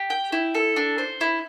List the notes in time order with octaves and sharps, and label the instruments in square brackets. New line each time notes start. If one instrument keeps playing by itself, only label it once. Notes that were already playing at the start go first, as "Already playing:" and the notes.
Already playing: [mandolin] G4
G5
E4
A4
D4
C5
E4